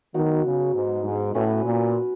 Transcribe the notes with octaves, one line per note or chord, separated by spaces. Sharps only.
D#3 F#3 B3 D#4 F#4
C#3
G#2
G#2
A2 C#4 F#4 B4
A#2